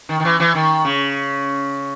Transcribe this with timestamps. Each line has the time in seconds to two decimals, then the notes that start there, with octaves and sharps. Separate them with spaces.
0.09 D#3
0.20 D#3
0.25 E3
0.40 E3
0.55 D#3
0.85 C#3